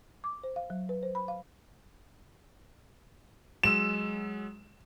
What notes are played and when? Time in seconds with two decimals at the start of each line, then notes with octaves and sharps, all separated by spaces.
0.24 D6
0.44 C5
0.56 F5
0.70 F#3
0.89 B4
1.03 C5
1.15 B5
1.28 F5
3.63 F#3 G#3 E6 E7